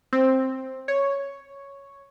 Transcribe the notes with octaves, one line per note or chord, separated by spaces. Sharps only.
C4
C#5